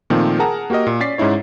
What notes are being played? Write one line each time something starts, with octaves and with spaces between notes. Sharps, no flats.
A#2 D#3 F3 A3 C4
G#4 A#4 F#5 A5 A#5
A#3 F#4 G4 A#4 D#5
A#2
C#4 D5 A6 B6 C7
G#2 C#4 D#4 E4 C#5